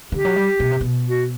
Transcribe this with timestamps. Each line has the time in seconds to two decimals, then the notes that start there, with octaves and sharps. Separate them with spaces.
0.12 D3 G4
0.25 F#3
0.36 G3
0.60 B2
0.71 C3
0.81 B2
1.08 F#4